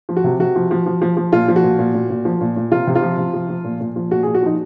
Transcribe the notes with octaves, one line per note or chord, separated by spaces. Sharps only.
F3
F#4
C3
C3 F#4
F3
F3
F3
F3
F3
A#2 F4
F3
F#4
A#2
A#2
A#2
A#2
F3
A#2
A#2
C3 F4
C3
F4
F3
C3
F3
F3
A#2
A#2
F3
A#2 F#4
G#4
A#2
F#4
F3 D#4